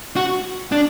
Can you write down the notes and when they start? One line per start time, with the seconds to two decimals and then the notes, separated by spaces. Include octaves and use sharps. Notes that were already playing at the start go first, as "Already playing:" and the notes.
0.16 F#4
0.72 D4